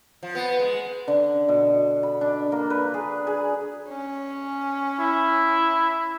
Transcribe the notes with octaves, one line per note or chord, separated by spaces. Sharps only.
F3
B3
G#3
D3
B2
B5
D4
A#3
B4
G#4
G#4
C#4
E4